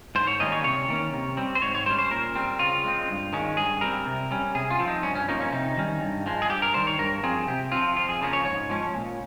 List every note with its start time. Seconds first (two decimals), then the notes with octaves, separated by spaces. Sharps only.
0.15 G#2 C5
0.27 C#5
0.40 D#3 G3 A#3 C#4 D#5
0.52 C#5
0.64 C3 C#5
0.88 D#3 A#3 C#4
1.13 C3
1.37 G3 C4
1.55 C5
1.62 G#2 C#5
1.75 C#5
1.86 G3 C5
1.91 C#4
1.98 C5
2.11 A#2 A#4
2.35 G3 C4
2.59 C#3 F4
2.84 G#3 C4
3.08 G2
3.33 D#3 G#3 C#4
3.57 G2 G#4
3.81 G3 C4 A#4
4.06 C3
4.31 G3 C#4
4.55 C3 G#4
4.71 F4
4.79 F3 C4
4.88 D#4
5.03 G2 C#4
5.15 C#4
5.29 F3 A#3 C#4 D#4
5.40 C#4
5.52 C3 D#4
5.77 D#3 G3 C#4
6.01 G2
6.26 F3 G#3
6.42 G#4
6.50 G2 G4
6.62 A#4
6.74 D#3 G3 C5
6.87 C#5
6.99 G2 A#4
7.23 F3 C4 G#4
7.47 C3 G4
7.72 F3 C4 F4
7.96 F2 F4
8.09 G#4
8.21 C#3 F3 A#3 C#4
8.33 C#5
8.45 G#2 C#5
8.70 F3 G#3 C#4
8.94 A#2